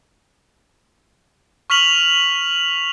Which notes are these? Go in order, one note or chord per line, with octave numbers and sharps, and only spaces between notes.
C#6 F6 B6 F7 F#7